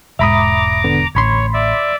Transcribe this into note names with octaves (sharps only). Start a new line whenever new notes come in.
E1 G#2 E5 A#5 B5 D6 D#6
D3 B3
A1 D2 C#5 B5 C6
D5 E5